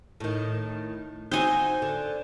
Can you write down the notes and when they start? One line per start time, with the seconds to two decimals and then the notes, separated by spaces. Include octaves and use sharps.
0.20 A2 D#3
1.32 C4 D#4 F#4 C5 G#5
1.82 D3